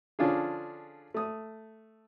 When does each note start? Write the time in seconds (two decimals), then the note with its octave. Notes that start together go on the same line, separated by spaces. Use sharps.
0.19 D3 F3 C#4 D4 F4 G#4
1.14 A3 D#6